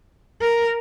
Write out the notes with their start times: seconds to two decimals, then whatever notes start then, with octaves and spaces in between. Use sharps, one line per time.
0.41 A#4